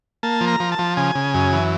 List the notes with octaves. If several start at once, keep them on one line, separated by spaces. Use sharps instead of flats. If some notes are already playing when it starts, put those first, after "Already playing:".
A#3 A5
F3
A#5
F3
A5
F3
C#3 G#5
C#3
F#2
E3